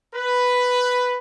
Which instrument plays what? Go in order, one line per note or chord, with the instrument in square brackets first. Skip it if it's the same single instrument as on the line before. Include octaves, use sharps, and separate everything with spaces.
[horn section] B4